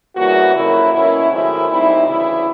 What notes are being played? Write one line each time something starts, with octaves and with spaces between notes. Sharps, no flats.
E2 C#3 E3 G3 A#3 F#4
F2 C#3 F#3 A#3 E4
B2 F#3 A#3 C#4 E4
G#2 D#3 F#3 A3 C4 E4
A#2 G3 C4 D#4 E4
D2 C#3 E3 E4